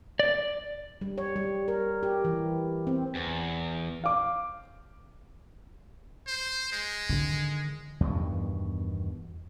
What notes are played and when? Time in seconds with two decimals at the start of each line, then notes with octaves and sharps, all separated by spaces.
0.20 D5
1.01 G3
1.18 C#5
1.36 G3
1.68 A#4
2.03 G4
2.25 E3
2.87 C4
3.15 E2
4.04 F5 D6
6.27 C5
6.72 G#3
7.09 D3 D#3
8.00 E2 G2 B2 D#3